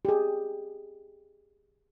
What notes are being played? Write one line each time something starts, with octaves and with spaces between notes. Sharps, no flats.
G4 G#4